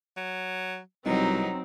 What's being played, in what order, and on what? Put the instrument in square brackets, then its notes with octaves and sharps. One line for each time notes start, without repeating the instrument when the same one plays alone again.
[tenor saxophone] F#3
[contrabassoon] C2 [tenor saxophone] B2 [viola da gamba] F#3 D#4 [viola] C4